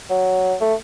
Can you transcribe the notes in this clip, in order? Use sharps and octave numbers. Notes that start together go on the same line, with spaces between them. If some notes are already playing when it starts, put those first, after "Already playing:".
F#3
A3